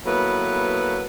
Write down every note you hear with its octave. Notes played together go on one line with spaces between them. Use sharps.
F#3 A#3 B3 E4 A4 B4